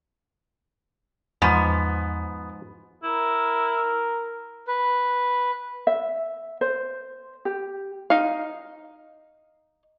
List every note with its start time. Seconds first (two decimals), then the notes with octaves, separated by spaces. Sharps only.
1.42 E2 G#2 F3 B3
3.03 E4 A#4
4.67 B4
5.87 E5
6.61 C5
7.45 G4
8.10 D#4 F5